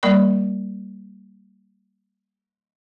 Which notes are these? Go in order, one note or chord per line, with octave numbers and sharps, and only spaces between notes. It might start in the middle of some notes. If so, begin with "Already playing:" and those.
G3 A#3 A#4 D5 B5 C#6